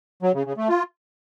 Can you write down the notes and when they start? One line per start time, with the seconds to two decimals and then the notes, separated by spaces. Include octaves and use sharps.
0.23 F#3
0.34 C#3
0.46 C#3
0.57 A3
0.69 F4